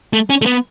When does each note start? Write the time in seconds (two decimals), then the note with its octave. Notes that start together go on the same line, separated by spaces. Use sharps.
0.13 A3
0.30 C#4
0.42 A3
0.46 B3